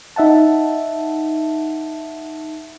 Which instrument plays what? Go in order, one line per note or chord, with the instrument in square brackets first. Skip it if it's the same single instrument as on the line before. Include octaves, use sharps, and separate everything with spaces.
[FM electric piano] D#4 E5 F#5 A5